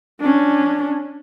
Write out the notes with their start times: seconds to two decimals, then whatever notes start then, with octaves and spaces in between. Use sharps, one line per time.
0.20 C#4 D4